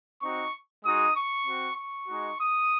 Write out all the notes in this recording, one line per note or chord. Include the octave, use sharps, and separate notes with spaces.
C4 D#4 F#4 C#6
G#3 D#4 F#4 D#6
C#6
C4 F#4
C#6
G#3 D#4 F#4
D#6